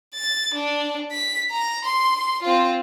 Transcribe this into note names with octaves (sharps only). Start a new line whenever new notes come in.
A6
D4
B6
A#5
C6
C4 F4